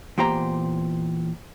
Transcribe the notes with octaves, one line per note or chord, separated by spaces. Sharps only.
E2 A#2 G4 C5 A#5